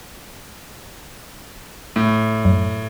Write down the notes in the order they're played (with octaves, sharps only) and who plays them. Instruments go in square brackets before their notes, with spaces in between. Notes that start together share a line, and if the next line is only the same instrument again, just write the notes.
[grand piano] A2
[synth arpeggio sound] F#2